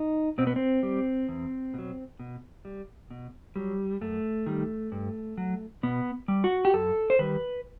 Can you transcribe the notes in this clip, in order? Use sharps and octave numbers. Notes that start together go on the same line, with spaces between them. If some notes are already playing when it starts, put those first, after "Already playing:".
Already playing: D#4
B2 C4
B3
C4
G3
E2
B2 F#3
B2
G3
B2
F#3 G3
F#2 A3
D#3 G3
G2
F#3
B2 B3
G3
F#4
G4
F#2 A4
C5
D#3 G3 B4